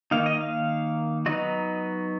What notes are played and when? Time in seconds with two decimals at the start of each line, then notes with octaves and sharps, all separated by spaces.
0.11 D#3 A#3 D#4 F5
0.26 D#5
0.41 F5
1.26 F#3 B3 D#4 D#5